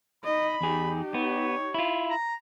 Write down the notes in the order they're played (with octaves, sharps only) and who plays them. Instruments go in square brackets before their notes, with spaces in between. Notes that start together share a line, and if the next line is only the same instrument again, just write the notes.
[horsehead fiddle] D#4 D#5 [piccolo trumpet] B5
[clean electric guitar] E2 G#4 [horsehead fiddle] D#4 G4
[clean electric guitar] B3 [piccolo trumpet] C#5
[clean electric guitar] E4 F4
[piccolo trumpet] A#5